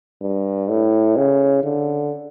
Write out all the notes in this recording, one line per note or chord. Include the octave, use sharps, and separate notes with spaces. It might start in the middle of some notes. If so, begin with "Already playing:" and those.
G2
A2
C#3
D3